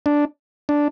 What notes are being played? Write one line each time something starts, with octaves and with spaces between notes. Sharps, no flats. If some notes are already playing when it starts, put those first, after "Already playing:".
D4
D4